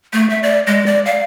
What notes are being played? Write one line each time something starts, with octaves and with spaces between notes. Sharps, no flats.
A3
E5
D5
G#3
D5
F5